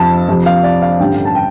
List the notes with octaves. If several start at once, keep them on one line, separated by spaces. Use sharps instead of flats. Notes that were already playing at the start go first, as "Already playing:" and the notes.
Already playing: F2 C3 F3 A5
F2 C3 F3
F5
D5
F5
A1 G2 D3 G3 G5
A5
G5